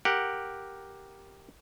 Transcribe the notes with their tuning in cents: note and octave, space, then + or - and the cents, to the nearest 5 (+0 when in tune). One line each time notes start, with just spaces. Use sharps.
G4 +0 A#4 +0 F#5 +0